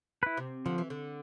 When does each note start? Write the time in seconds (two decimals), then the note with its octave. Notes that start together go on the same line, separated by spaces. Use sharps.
0.23 E4 B4
0.37 C3
0.66 D3 F3
0.78 E3
0.90 D3